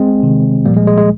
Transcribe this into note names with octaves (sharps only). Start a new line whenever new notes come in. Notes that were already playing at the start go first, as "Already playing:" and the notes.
Already playing: G#3 C4
C3 D#3
A#2 F3 G3 A#3
G#3
G#3
G#3